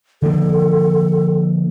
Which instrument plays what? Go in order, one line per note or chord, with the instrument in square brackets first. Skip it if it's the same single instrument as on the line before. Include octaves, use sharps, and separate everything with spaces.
[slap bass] D3 F3 A#3 [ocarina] A4